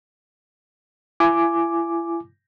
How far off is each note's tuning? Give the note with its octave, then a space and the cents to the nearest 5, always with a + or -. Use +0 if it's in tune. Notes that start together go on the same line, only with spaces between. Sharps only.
E4 +35 G#5 +5 D6 +0